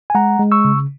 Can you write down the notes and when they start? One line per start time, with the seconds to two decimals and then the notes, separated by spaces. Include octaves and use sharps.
0.10 G#5
0.15 G#3 F#5 A#5
0.39 G#3
0.52 C#6 E6
0.65 C#3